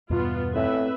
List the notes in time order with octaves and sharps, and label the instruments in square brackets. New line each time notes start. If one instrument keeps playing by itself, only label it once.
[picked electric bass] E2 G2 B2 [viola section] B3 F4
[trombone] A2 [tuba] C4 [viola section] B4 E5